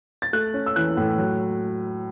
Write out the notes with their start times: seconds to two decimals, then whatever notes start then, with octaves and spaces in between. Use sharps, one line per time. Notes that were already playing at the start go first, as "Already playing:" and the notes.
0.22 A6
0.33 A3 F#6
0.54 C#4
0.66 E6
0.76 E3 F#6
0.97 A2
1.18 F#3